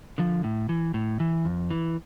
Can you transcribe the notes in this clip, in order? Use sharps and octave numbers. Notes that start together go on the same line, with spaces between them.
D3 F3
A2
E3
A2
E3
F2
E3